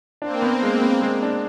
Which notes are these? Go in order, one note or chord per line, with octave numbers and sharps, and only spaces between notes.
A#3 C4 D4
B3
G#3
B3
G#3
D4